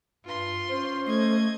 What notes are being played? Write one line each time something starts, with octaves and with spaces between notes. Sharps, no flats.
G2 F4 C6
C#4 C5
A3 D#5 G#6